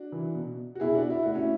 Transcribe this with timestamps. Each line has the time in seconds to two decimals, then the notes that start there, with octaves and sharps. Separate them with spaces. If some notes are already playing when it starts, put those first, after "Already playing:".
Already playing: D4 F#4
0.12 E3
0.35 B2
0.75 F#4
0.80 B2 E4 G#4
0.95 D4 F#4
1.10 E4
1.23 A2 F#4
1.34 C#4 E4